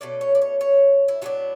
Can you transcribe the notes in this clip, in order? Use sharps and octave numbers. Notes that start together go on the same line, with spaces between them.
B2 A3 C#4 D5
C#5
D5
C#5
C#5
E4
A2 F#3 B3 D4 F#4